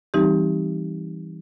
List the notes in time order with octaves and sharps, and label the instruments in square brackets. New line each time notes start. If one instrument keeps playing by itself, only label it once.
[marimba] E3 G3 C4 D#4 G4